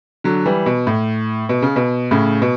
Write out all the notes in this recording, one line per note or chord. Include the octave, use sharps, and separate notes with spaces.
D3 F#3
E3 G3
B2
A2
B2
C#3
B2
A2 C#3
B2